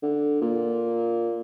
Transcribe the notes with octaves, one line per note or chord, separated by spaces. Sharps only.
D3
A#2